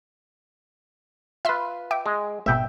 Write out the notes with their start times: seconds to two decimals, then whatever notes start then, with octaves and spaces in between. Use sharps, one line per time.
1.45 F4 B4 E5 C6 E6
1.91 E5 G5 D6
2.06 G#3
2.46 G#1 B2 E5 G5